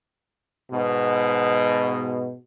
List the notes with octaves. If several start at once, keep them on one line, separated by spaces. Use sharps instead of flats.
G#2 B2